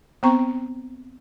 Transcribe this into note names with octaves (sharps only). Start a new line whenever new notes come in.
B3 C4 C5 A#5 C#6